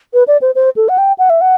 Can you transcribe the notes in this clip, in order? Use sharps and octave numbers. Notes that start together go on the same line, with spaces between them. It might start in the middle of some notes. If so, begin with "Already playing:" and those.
B4
D5
C5
C5
A4
F#5
G5
F#5
E5
F#5